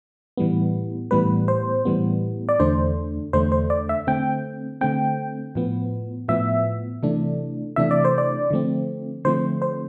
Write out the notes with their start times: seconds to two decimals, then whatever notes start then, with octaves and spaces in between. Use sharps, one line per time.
0.37 A2 E3 G3 B3
1.11 A2 E3 G3 B3 B4
1.48 C5
1.85 A2 E3 G3 B3
2.49 D5
2.59 E2 D3 A3 D4 C5
3.33 E2 D3 A3 D4 C5
3.52 C5
3.70 D5
3.89 E5
4.07 D3 A3 C4 G5
4.81 D3 A3 C4 G5
5.55 A2 F3 B3
6.28 A2 F3 B3 E5
7.03 C3 E3 A3 D4
7.76 C3 E3 A3 D4 E5
7.91 D5
8.05 C5
8.18 D5
8.50 D3 F3 A3 C4
9.25 D3 F3 A3 C4 C5
9.62 C5